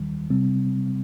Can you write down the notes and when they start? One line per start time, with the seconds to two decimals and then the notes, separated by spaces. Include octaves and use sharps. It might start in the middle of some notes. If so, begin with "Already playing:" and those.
Already playing: D#2 D#3 G3
0.30 C3 G3 C4